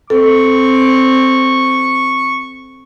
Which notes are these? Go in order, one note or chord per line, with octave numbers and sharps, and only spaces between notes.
C4 A4 C#6